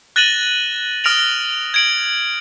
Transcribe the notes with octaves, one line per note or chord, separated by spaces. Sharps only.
F#6 A6 A#6 D#7 E7 F#7
D#6 F6 A#6 D7 F7 F#7
G#6 D7 F#7